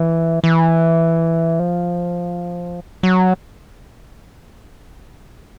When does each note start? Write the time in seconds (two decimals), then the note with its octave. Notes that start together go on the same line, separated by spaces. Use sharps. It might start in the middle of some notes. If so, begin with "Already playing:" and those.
Already playing: E3
0.44 E3
1.59 F3
3.03 F#3